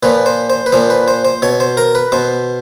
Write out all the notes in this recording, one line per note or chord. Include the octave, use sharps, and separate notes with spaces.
A#2 F3 B4
C5
C5
B4
A#2 F3 C5
B4
C5
C5
B2 C#5
C5
A#4
B4
B2 C5